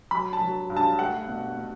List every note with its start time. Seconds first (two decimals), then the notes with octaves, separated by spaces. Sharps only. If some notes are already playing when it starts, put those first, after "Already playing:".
0.11 F#3 B5
0.33 A5
0.41 F#3
0.70 G2
0.77 A5
0.99 A3 F#5
1.28 B2
1.56 B2